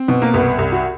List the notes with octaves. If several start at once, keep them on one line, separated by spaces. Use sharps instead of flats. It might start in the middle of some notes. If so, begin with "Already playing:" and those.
Already playing: C4
B2
A#3
C2 B3
C2
F#4